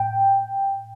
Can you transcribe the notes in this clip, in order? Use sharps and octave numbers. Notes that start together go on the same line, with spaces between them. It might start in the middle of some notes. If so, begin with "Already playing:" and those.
Already playing: A2 G5